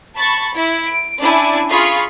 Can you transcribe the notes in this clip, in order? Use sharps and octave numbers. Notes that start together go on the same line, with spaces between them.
A5 B5 C#6 A6
E4
D7
C#4 D4 E4 D5 G#5 A5
F4 G#4 F5 B5 C#6